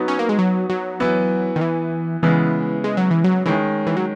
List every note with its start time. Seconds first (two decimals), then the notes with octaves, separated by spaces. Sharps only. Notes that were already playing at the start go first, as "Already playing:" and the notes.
Already playing: F#3 B3 D#4 F#4
0.08 C#4
0.19 A#3
0.29 G#3
0.39 F#3
0.70 F#3
1.00 E3 B3 E4
1.56 D#3
1.61 E3
2.23 C#3 E3 G#3 B3 E4
2.84 G#3
2.97 F#3
3.11 E3
3.24 F#3
3.46 D#3 E3 G#3 C#4
3.87 E3
3.97 F#3